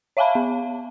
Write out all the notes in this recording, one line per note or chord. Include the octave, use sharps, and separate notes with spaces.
C#5 E5 F5 G#5 A5 B5
B3